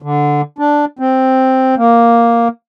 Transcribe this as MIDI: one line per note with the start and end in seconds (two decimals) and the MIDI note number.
0.02 0.41 50
0.58 0.85 62
0.99 1.75 60
1.77 2.48 58